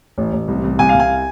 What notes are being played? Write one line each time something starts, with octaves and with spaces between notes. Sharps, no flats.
A1
A1
C2
C2
C2 G#5
F5
C2
G#5